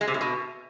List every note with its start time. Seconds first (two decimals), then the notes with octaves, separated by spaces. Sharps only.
0.01 G#3
0.07 C3
0.14 A2
0.21 B2